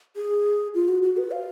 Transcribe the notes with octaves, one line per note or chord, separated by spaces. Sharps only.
G#4
F4
F#4
F#4
B4
F5